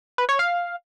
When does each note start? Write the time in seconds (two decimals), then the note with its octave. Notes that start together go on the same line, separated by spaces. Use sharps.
0.18 B4
0.29 C#5
0.39 F5